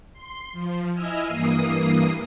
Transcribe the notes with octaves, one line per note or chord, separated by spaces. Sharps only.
C6
F3
E4 D#5 G#5 E6 F6
G2 E3 A#3 D#6 C7